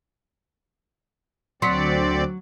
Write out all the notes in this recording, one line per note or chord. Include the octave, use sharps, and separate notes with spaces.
D2 F#3 C4 D5 C6 B6 C#7